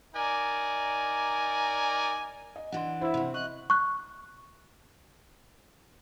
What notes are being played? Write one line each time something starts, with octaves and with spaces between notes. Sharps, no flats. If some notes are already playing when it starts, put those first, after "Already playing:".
D#4 A#4 D5 G#5
D#5
E3 D4 F#5 C6
E4 C5 E5
C3 F#4
D#5 C6 C#6 F#6
C#6 F#6